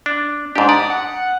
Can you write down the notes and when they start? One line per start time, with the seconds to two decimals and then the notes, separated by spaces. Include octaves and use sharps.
0.06 D4
0.56 G#2 D4 G4
0.69 D5 D#6
0.90 F#5